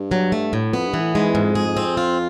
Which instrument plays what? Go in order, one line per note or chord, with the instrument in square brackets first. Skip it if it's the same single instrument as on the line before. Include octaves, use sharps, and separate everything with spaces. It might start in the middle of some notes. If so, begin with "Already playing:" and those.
Already playing: [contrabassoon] G2
[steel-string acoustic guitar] F#3
A3
A2
[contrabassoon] F2 [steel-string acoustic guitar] B3
[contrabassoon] G2
[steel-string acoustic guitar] E3
[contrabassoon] A2
[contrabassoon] G#2 [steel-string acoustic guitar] G#3
[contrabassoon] E2
[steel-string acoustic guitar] G#2
[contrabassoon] F2
[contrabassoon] F2 [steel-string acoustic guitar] G#4
[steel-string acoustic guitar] C4
F4